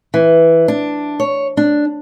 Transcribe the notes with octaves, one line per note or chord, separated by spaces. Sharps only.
E3
D4
C#5
D4